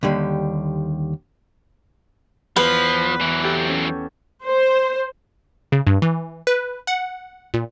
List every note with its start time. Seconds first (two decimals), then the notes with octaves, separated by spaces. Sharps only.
0.03 D#2 D3 G3
2.56 E2 F3 B4
3.21 E3 F#3
3.43 G4 A4 G6
3.69 C#4
4.45 C5
5.72 C#3
5.87 G2
6.02 E3
6.47 B4
6.87 F#5
7.54 A#2